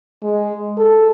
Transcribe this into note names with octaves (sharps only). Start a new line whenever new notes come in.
G#3
A4